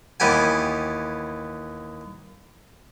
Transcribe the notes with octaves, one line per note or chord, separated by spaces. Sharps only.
D#2 E3 B3 G4 G#5